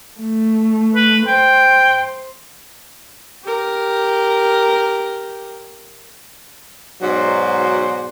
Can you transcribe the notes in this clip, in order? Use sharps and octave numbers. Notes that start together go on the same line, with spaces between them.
A3
B4
C5 G5
G4 A#4
G#2 B2 F#3 F#4 C5 D5